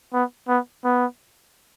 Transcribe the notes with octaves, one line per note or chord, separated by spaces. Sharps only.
B3
B3
B3